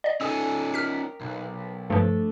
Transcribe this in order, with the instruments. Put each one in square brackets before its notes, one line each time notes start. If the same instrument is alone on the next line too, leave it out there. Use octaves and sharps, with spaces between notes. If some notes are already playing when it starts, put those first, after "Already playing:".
[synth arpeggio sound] D5 D#5
[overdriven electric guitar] C#4 D#4 [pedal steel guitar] A4 G#5 E6
[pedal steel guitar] G4 A#4 [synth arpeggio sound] F6 B6
[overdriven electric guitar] B1
[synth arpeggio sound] G2 F3 [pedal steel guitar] A3 D4 A4